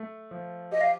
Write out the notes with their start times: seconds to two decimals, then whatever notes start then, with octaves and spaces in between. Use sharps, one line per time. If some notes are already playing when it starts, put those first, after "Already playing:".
Already playing: A3
0.31 F3
0.72 G4 D#5
0.80 F5